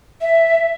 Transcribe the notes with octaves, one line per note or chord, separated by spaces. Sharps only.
E5